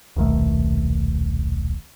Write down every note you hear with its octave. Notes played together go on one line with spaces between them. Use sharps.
D#1 B1 D#3 A3